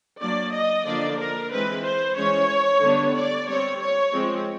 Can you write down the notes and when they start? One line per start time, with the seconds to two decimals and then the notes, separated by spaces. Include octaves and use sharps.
0.20 F#3 A#3 D4 D5
0.53 D#5
0.86 D3 F3 A#3 D4 D5
1.19 A#4
1.51 E3 G#3 C4 B4
1.84 C5
2.17 E3 G#3 C#4 C#5
2.83 D3 G3 B3 D4
3.15 D5
3.48 G3 C4 C#5
3.81 C#5
4.13 F3 G#3 C4